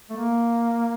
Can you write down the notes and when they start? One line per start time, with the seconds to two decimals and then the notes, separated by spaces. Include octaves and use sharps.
0.10 A3
0.16 A#3